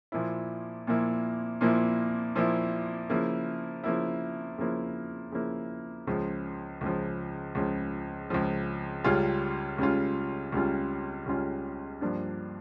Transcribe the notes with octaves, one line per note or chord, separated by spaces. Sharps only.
A#2 F3 A#3 E4
A#2 F3 A#3 E4
A#2 F3 A#3 E4
A#2 F3 A#3 E4
C#3 F3 A#3 E4
C#3 F3 A#3 E4
C#3 F3 A#3 E4
C#3 F3 A#3 E4
C#2 C#3 F3
C#2 C#3 F3
C#2 C#3 F3
C#2 C#3 F3
C#2 C#3 G3 C#4 F4
C#2 C#3 G3 C#4 F4
C#2 C#3 G3 C#4 F4
C#2 C#3 G3 C#4 F4
G2 F3 A#3 D4